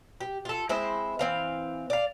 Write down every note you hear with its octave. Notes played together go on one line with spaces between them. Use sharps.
G4
F4 A4
G#3 C4 E4 C5
E3 C4 F5
D5 F5